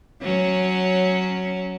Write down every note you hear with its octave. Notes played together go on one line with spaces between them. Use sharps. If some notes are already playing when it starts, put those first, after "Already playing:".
F#3 C#4